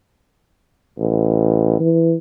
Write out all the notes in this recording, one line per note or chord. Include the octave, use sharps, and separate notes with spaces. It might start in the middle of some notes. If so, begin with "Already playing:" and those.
A1
E3